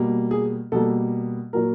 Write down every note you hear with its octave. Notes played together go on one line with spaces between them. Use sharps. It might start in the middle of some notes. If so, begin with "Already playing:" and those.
Already playing: B2 G3 A#3
G#4
B2 G3 A#3 A4
A#2 F#3 A#3 A#4